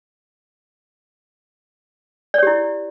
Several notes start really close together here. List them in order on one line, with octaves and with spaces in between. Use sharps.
D5 C#5 G4 E4